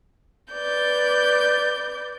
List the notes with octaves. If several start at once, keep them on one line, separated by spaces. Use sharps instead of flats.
B4 D5 G6